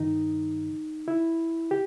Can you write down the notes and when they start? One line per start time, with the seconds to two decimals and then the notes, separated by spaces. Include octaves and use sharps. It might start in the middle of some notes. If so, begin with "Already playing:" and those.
Already playing: G2 D#3 D#4
1.08 E4
1.71 G4